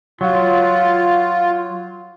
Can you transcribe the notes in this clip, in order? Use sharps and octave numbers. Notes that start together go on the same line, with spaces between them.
F#3 F4